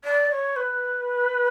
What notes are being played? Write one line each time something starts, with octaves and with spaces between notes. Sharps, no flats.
D5
C#5
B4